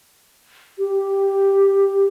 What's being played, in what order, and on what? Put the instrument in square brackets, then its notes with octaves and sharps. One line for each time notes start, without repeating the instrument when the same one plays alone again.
[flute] G4